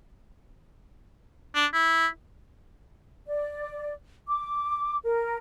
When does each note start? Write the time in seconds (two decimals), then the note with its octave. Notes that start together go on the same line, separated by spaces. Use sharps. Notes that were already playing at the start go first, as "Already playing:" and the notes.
1.55 D4
1.74 E4
3.26 D5
4.28 D6
5.03 A#4